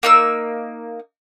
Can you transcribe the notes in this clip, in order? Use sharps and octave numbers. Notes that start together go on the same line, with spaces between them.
A#3 D#4 E6